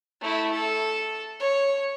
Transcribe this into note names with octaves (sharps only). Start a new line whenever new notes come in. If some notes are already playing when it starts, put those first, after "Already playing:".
A3 E4
A4
C#5